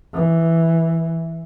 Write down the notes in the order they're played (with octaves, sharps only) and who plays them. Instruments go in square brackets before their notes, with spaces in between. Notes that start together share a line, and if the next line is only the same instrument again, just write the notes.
[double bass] E3